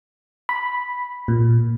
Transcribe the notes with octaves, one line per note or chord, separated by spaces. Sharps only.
B5
A#2